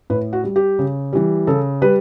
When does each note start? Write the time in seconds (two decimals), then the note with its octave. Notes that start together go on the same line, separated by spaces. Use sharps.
0.10 A2 B4
0.33 F#4
0.44 G3
0.56 G4
0.79 C#3
1.13 E3 G3
1.47 C#3 A4
1.82 G3 B4